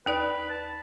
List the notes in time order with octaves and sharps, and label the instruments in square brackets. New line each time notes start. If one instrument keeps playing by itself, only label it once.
[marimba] D#2 D#4 D5 [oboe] B4
[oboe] A5